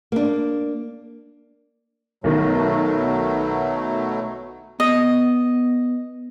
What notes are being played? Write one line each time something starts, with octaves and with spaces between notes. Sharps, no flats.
A#3 D4
B1 B2 D#3 F#3 A3
B3 D#5